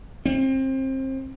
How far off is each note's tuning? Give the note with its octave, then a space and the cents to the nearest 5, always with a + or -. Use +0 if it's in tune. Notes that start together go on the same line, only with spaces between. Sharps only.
C4 +25